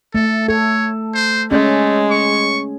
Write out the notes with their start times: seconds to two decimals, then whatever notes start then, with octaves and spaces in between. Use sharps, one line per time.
0.15 A3 A4
0.48 A4 C#5
1.15 C5
1.51 G#3 A3 C#4
2.10 C#6